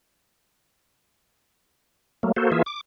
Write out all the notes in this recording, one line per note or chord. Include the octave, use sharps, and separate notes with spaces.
F#3 A3 A#3
A#3 F#4 A4 C5
E3 A#3 F4 G#4 E5
D6